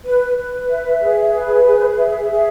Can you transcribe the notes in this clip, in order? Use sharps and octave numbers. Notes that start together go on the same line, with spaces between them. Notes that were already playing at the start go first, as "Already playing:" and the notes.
B4
B4
E5
G#4
B4
G#4
E5
G#4